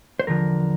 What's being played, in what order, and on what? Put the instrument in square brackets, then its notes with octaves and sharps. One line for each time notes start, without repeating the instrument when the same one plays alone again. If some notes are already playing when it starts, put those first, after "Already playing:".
[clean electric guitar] C5
E2 D3 F3 A#4